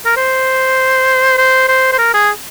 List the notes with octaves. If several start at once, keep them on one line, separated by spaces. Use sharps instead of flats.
A#4
C5
C5
C5
C5
A#4
G#4